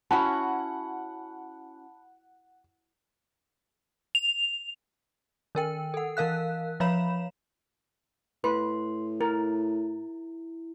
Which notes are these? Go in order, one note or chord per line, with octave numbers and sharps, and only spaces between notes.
C#4 E4 F#4 F#5 A5 B5 F#6
F7
D#3 A#4 G5
A4 F#5
E3 A#4 F5 F#6
F3 C#5 F5 B5 E7
A2 B4 C6
E4 A#4